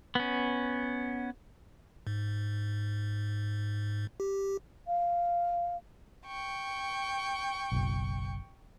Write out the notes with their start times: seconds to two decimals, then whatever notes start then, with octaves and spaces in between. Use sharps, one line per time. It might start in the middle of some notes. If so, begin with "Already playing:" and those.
0.15 B3 C#4
2.07 G#2
4.20 G4
4.87 F5
6.25 G5 C#6
7.72 F#1 B1